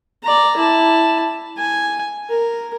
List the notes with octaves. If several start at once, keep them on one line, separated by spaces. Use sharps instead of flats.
D5 A#5
E4 A5
G#5
A#4